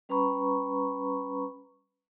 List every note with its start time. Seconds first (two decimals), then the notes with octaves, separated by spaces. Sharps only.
0.09 G3 C#4 B4 A#5 B5 C#6